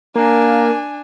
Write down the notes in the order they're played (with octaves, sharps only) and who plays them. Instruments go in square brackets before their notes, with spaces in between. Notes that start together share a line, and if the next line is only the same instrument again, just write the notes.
[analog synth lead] A#3 [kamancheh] D4 G#5